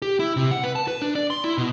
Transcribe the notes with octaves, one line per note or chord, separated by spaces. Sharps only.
G4
E4
C3
F#5
B4
A5
B4
D4
D5
C6
E4
B2